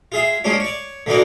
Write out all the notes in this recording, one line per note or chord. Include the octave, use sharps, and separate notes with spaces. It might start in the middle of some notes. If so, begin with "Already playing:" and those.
F4 G#4 E5
F3 G#3 A#3 C#4 D4 F4
C#5 D5
D3 E3 A#3 D#4 F#4 D5